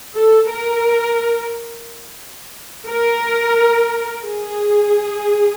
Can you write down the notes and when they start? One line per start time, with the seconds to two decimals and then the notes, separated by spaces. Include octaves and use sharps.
0.16 A4
0.50 A#4
2.87 A#4
4.22 G#4